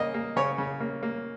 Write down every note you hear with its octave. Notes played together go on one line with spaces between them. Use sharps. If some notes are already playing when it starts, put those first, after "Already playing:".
Already playing: C#3 A#3 D#5
A#3
C#3 C#5
C#3
A#3
A#3